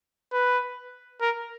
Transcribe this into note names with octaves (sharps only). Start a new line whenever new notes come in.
B4
A#4